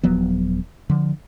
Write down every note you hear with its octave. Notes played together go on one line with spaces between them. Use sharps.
D#1 F3 F#3 B3
D3 F3